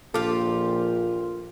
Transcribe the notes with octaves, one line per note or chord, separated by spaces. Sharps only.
A#1 A#2 F4 G4 A4 D6